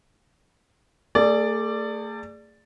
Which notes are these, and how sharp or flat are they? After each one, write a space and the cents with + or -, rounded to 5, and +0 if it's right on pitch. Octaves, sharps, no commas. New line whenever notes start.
A3 +40 G#4 -5 D5 +0